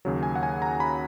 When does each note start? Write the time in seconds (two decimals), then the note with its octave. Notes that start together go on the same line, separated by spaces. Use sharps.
0.05 D#2 C#3 F#3
0.23 G#5
0.36 F#5
0.43 G#5
0.62 A#5
0.80 B5